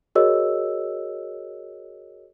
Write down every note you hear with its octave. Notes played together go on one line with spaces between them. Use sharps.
F#4 G#4 A#4 C#5 D#5 E6